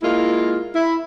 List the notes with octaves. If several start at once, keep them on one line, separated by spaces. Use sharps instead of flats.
G#3 A#3 E4 F4
E4